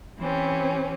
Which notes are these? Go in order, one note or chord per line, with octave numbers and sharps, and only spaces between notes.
E3 C4 C#4 G4